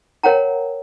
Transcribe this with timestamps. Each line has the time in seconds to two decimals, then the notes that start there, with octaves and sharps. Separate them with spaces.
0.23 A#4 C#5 F#5 G5 A#5